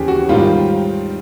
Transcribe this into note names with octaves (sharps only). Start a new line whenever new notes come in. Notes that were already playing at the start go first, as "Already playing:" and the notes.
Already playing: D#2 C#3 E3 G4 G#4
F#4
G#2 D#3 G3 F4